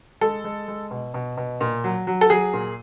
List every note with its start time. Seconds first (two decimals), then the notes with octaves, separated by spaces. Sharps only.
0.21 G#3 A4
0.44 G#3
0.68 G#3
0.91 B2
1.14 B2
1.37 B2
1.61 A#2
1.84 F#3
2.07 F#3
2.21 A4
2.30 F#3 G#4
2.53 A#2